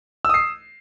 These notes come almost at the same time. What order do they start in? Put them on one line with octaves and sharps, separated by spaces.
E6 D#6 C7